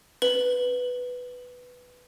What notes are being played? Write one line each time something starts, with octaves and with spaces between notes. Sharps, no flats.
B4 F#7